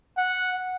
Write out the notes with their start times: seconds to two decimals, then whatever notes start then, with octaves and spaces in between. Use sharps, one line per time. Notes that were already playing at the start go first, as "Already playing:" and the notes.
0.18 F#5